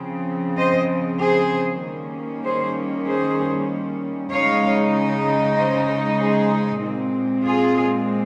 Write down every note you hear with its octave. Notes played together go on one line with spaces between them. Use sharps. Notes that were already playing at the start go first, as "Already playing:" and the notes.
Already playing: C#3 F3 C4
C5 D#5
G#4 C5
D#3 G3 A#3 C#4
G#4 C5
G#4 C5
C#3 G#3 D#4 C#5 F5
C5 D#5
G#4 C5
A#2 G#3 C4
F4 G#4